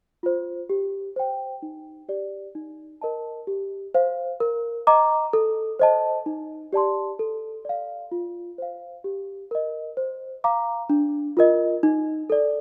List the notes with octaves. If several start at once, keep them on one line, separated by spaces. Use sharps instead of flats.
F4 C5
G4
C5 G5
D#4
G4 D5
D#4
A#4 D#5 A5
G4
C5 F5
A#4
D#5 A#5 D6
A4
C5 D#5 A5
D#4
G4 D5 A5 C6
A4
D5 F5
F4
C5 F5
G4
A#4 D#5
C5
F5 A#5 D6
D4
F4 A#4 D#5
D#4
A4 D5